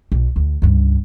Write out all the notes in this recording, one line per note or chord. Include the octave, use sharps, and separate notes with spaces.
B1
D2
C#2 G2